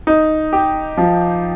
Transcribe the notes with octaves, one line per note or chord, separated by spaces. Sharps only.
D#4
G4
F3